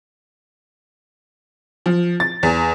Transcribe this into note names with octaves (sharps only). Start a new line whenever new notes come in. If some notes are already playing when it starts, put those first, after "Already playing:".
F3
A6
E2